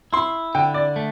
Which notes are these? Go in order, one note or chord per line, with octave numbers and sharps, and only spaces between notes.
E4 C6
D3 G5
D5
A3